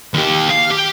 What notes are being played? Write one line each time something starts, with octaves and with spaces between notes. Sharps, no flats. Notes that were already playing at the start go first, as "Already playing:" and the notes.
D#2 G4
F5
G4